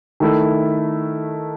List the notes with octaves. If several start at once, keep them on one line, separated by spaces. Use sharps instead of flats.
D#3 A3 E4